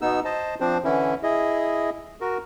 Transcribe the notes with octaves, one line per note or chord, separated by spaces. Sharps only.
B2 B3 D#4 E6
C5 D#5 A5
F3 C4 D4 C5
D3 E3 C#4 E4
E4 G#4 D#5
F#4 A#4